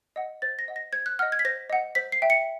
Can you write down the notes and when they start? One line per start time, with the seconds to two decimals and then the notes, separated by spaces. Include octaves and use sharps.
0.16 D#5 F#5
0.42 C5 A6
0.59 A#6
0.68 D#5 F#5
0.76 A#6
0.93 C5 G#6
1.06 F#6
1.19 D#5 F#5 F6
1.32 G#6
1.39 B6
1.45 C5 A#6
1.70 D#5 F#5
1.95 C5 B6
2.12 C7
2.22 E5 G5
2.30 C#7